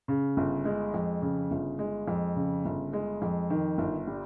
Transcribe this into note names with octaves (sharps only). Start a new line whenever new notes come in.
C#3
G1
G#3
F2
C#3
G1
G#3
F2
C#3
G1
G#3
F2
D#3
G1
G3